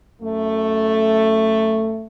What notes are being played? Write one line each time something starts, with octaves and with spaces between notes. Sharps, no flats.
F#2 A3